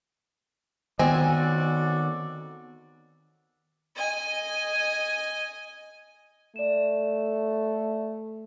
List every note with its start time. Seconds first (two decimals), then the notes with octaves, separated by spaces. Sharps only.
0.99 D#3 B3 C4 F#4 A4 D5 D#5 G#5
3.96 D#5 G#5
6.56 A3 D5 E7